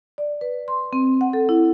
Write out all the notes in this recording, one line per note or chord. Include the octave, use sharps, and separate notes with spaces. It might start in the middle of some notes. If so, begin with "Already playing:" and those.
D5
B4
C6
C4
F#5
A4
E4